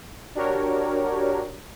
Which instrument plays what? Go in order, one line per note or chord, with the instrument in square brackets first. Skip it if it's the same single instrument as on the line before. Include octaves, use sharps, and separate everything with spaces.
[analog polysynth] D4 F#4 G4 A#4 C#5